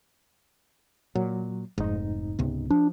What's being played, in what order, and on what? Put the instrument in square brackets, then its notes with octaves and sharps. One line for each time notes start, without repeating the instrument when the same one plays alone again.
[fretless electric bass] A#2 [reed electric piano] F#3
[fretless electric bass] F1 [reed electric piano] G#2 D#4
[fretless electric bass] C#2 C3 B3
[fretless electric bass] F3 [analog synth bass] D4